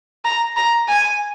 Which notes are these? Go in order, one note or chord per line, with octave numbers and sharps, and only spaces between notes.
A#5
A#5
G#5